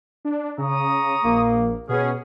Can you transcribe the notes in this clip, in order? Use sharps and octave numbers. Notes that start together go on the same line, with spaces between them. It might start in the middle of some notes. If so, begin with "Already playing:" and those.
D4
C#3 A#5 C#6 D#6
A#1 A#3
B2 B3 C#4 G#4